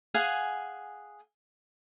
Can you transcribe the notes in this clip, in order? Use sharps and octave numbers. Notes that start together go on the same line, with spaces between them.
G#4 F5 F#5 G#5